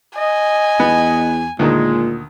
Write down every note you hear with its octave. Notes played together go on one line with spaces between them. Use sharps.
D#5 G#5
E2 B3
D2 A#2 D#3 G#3